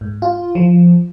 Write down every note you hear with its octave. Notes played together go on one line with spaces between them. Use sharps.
G#2
F4
F3